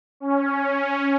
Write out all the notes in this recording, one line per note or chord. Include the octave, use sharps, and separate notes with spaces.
C#4